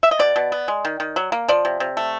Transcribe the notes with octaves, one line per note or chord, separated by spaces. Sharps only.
E5
D#5
B2 D5
B2
B3
G#3
D#3
D#3
F#3
A#3
F3 D5
C3
C3
A3